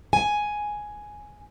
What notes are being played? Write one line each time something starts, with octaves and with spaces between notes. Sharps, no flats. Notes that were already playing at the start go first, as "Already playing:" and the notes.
G#5